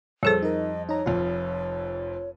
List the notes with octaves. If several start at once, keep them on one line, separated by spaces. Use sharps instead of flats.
F2 G3 G#4 A4 C5 C#5 E5
D#4 A#4 D#5
D#4 C#5 A#5
F1 F2 F4